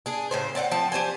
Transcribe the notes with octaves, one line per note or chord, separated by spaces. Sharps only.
D4 G#4
A2 C#3 C5
C4 D5 D#5 F#5
F3 C4 A5
G4 C5 D5 G#5